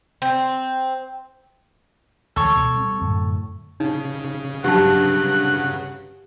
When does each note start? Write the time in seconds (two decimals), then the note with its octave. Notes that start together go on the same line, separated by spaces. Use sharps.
0.22 C4
2.36 D2 E3 G#3 A4 C#5
2.56 B2
2.75 G3 C4
3.01 F#2 A2 D3
3.80 C#3 D#4
4.64 G2 F#3 G4 F#5 A5